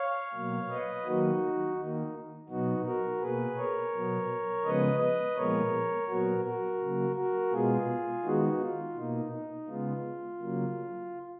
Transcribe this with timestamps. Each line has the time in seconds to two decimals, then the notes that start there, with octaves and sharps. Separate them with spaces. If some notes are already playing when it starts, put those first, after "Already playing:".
Already playing: C#5 F5
0.34 B2 F#3 A#3
0.70 B4 D#5
1.05 D#3 F#3 A#3 D#4 F#4
1.77 D#3 A#3 D#4
2.49 B2 F#3 B3 D#4 F#4
2.85 F#4 A#4
3.21 B2 A#3 G#4 B4
3.57 A#4 C#5
3.93 B2 F#3 B3
4.65 C#3 F3 G#3 B3 B4 D#5
5.00 B4 D#5
5.36 A#2 F3 G#3 B3 A#4 C#5
6.08 A#2 F#3 B3 F#4 A#4
6.45 F#4 A#4
6.80 C#3 F#3 A#3
7.16 F#4 A#4
7.52 B2 G#3 B3 F4 G#4
8.24 D#3 G#3 B3 D#4 F#4
8.60 F4
8.96 B2 A#3 D#4
9.32 D#4
9.68 C#3 G#3 B3 F4
10.40 C#3 F#3 A#3